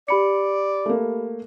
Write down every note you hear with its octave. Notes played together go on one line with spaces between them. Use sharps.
G4 D5 B5 C#7
A3 A#3